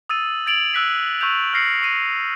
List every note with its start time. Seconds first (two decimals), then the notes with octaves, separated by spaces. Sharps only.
0.09 D#6 E6 A6 D#7
0.46 G#6 A6 D7 F7 F#7
0.73 E6 F#6 B6 C7
1.21 C#6 E6 F#6 G6 F7
1.53 F6 A#6 C7 C#7 F#7
1.82 C#6 C7 D#7